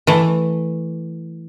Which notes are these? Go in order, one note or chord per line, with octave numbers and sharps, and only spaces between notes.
E3 A3